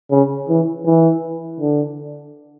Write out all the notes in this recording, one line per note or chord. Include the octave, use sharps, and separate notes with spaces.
C#3
E3
E3
D3